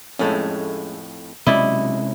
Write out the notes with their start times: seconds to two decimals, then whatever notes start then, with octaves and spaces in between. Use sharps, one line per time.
0.19 F2 A2 G#3 A3 C#4
1.47 B1 C3 G#3 C#4 E4 D5 D#5 B5